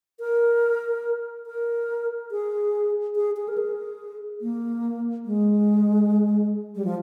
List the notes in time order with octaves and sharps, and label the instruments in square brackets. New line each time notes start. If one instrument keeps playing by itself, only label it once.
[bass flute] A#4
A#4
G#4
G#4
G#4
A#4
G#4
A#3
G#3
G3
F3